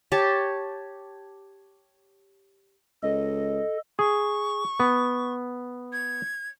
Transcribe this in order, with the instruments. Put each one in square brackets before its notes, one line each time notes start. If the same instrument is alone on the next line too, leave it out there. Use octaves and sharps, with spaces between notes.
[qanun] G4 C#5 A5
[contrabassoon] C#2 [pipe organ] A4 [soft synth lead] D#5
[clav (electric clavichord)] G#4 [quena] C#6
[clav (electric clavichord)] B3
[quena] G#6